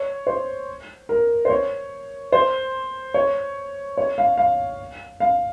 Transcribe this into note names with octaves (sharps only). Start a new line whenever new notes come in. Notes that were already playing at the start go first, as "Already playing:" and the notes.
Already playing: C#5
C5
A#4
C5
C#5
C5
C#5
C#5
F5
F5
F5